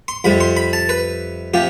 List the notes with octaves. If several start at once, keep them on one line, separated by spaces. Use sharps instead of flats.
C6
F2 C3 G3 B5
C6
B5
A5
B4
C3 F3 G4